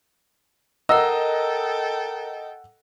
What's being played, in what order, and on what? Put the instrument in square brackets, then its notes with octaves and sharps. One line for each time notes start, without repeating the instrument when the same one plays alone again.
[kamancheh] A4 G5 [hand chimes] A#4 A#5 [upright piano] D#5 [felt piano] F#5 E6